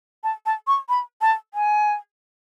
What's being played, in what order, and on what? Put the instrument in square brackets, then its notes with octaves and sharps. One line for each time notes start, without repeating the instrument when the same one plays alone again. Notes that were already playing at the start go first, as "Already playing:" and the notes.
[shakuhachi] A5
A5
C#6
B5
A5
G#5